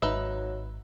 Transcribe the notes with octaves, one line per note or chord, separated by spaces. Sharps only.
G#1 F#3 D#4 B4 E5